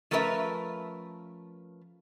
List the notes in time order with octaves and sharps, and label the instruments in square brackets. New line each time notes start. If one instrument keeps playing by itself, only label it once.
[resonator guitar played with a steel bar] F3 A3 C#4 A#4 B4 E5